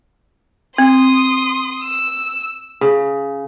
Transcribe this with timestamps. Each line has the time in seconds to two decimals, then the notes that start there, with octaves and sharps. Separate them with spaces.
0.78 C4 C6 D#6
1.83 E6
2.81 C#3